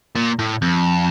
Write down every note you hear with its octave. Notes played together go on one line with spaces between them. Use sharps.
A#2
A2
F2